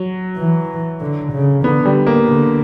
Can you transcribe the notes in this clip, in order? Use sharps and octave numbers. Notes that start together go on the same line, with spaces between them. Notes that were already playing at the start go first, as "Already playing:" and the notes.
Already playing: F#3
E3
D3
C#3
D3 B3
G3
A#3
D3